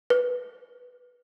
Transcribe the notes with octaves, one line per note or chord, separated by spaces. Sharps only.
B4